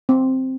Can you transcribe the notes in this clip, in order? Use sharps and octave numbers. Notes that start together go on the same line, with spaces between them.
C4